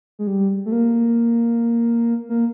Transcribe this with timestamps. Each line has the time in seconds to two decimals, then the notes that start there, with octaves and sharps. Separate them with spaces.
0.19 G#3
0.27 G3
0.66 A3
0.72 A#3
2.29 A#3